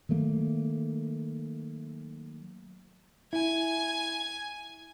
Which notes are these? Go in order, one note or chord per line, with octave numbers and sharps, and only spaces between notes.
D#3 F#3 A3 A#3
E4 G#5